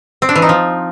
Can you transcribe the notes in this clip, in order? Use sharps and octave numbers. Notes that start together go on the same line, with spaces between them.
C4
D4
E3
D#4
F3